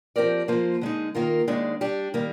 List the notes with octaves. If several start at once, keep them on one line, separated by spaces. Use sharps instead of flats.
F3 C4 G4 A#4 D5
F3 A#3 F4 C5
D3 G#3 D#4
D#3 A#3 F4 A#4
D#2 D#3 G#3 D4
G3 D4 G4
D#3 G3 A#3